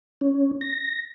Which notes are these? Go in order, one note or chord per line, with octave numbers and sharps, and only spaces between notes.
C#4
A#6